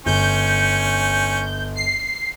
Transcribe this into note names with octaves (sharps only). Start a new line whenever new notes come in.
G1 C#4 G6
C7